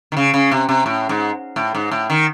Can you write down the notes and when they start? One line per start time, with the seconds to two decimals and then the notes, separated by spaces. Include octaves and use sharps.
0.12 D#3
0.17 C#3
0.34 C#3
0.51 C3
0.69 C3
0.86 A2
1.09 G#2
1.56 A2
1.75 G#2
1.91 A2
2.10 D#3